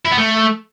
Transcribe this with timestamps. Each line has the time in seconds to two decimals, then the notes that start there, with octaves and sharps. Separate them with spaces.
0.05 E4
0.11 B3
0.18 A3